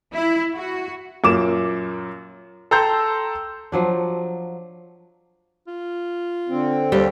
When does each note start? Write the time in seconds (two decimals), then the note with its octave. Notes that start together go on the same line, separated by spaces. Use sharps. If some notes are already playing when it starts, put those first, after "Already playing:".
0.12 E4
0.54 F#4
1.24 F#2 A#2 A#4 D6 E7
2.71 A4 G5 A#5 C6 E6 G6
3.72 F3 F#3 D4
5.67 F4
6.49 D3 C4
6.92 D#2 G3